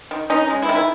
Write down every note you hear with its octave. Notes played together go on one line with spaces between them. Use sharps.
D#3
C#4 D#4
G#3
E4
D#3
E4